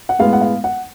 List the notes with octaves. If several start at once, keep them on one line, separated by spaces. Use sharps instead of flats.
F#5
A2 G#3 B3 F5
F#5
F5
F#5